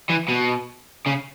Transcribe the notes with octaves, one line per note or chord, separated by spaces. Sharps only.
E3
B2
C#3